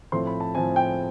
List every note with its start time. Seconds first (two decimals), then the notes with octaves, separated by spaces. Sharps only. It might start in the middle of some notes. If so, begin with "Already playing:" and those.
0.12 A2 F3 A3 C4 C6
0.27 B5
0.40 A5
0.55 A2 F3 A3 C4 G#5
0.76 G5